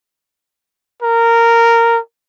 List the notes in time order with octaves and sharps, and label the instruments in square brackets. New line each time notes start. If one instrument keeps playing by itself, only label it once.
[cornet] A#4